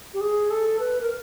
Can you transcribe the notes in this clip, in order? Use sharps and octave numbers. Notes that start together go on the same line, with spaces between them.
G4
G#4
A4
B4
A#4